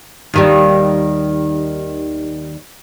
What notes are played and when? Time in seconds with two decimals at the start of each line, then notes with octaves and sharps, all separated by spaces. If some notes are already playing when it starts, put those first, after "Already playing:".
0.34 D#2 D#3 G3